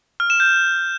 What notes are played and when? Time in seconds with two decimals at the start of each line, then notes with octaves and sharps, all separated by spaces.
0.20 F6
0.30 E7
0.40 G6